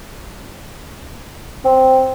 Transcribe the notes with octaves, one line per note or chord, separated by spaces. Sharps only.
C4